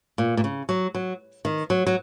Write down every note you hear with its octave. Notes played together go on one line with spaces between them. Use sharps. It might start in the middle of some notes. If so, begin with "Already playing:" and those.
A#2
A#2
C#3
F#3
F#3
D#3
F#3
F#3